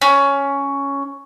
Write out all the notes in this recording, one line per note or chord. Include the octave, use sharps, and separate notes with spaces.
C#4